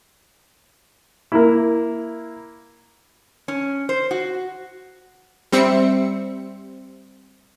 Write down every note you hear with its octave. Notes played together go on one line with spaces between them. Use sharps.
A#3 E4
C#4
C5
F#4
G3 C4 E5 C#7